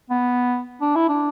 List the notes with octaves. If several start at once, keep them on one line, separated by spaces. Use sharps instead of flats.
B3
D4
E4
D4